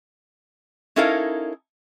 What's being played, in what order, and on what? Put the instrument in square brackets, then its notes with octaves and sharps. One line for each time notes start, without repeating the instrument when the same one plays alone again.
[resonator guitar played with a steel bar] C#4 D#4 E4 A4 A#4 F5